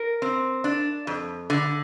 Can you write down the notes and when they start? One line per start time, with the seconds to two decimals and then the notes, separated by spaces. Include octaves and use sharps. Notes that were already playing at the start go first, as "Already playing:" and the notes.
Already playing: A#4
0.22 C4
0.64 D4
1.07 F2
1.50 D3